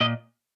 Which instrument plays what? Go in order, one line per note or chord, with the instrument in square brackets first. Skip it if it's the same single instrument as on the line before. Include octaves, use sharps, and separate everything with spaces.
[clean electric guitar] A#2 D#5